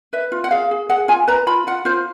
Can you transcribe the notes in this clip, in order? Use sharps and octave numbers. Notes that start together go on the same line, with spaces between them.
B4 E5
F4
F#5
G#4 F5
G#4
G#4 F#5
F4 G#5
B4 A#5
F4 B5
F4 F#5
F4 C5